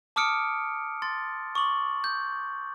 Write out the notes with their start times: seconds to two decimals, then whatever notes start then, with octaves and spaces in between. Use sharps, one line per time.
0.16 A5 D6 D#6 F6 C#7 D7
1.02 C6 A6
1.55 C#6 D6 F#7
2.04 G6